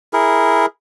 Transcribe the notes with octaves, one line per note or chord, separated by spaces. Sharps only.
E4 G#4 A#4